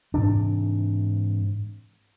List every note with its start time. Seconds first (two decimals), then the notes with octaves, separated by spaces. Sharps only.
0.14 G#2 C3 E3 D4